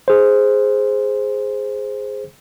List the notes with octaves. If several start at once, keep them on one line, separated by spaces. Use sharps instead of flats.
G#4 C5